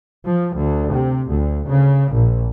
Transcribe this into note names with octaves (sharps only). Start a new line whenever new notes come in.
F3
D2
C3
D2
C#3
A#1